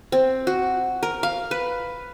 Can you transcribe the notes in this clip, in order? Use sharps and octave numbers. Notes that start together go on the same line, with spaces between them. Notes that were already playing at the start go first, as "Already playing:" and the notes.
C4
F#4
A#4
F5
B4